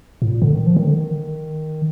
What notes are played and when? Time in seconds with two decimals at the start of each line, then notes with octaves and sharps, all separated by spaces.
0.22 A2
0.30 A#2
0.42 D3
0.54 D#3
0.67 F3
0.76 D#3
0.86 D3
0.95 D#3